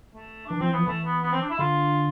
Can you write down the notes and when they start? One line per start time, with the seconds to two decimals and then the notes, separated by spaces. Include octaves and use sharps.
0.15 A3
0.47 E3 D4
0.60 F3 C4
0.69 E3
0.73 F3 B3
0.87 E3 A3
1.05 B3
1.23 B3
1.32 C4
1.42 D4
1.50 E4
1.59 D3 F4